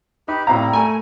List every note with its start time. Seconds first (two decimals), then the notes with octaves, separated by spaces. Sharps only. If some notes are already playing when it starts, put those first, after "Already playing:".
0.28 D#4 G4 B4 B5
0.47 A2 G3 C4 E4 F5 A#5
0.73 A3 A#4 G#5